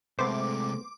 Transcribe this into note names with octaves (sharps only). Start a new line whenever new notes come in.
C3 G#3 A3 B3 C5 D6